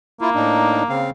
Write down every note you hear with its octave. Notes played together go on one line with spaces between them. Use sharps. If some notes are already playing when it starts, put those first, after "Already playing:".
A#3 E4 F4
A2 D4 D#4
C#3 C4 F5